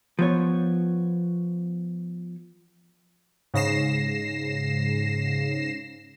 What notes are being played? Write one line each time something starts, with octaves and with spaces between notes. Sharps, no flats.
F3 B3 C#5
G#2 C#3 A#6 C7 E7